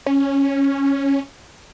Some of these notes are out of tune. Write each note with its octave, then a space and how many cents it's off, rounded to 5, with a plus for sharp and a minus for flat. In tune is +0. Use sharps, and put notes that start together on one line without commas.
C#4 -5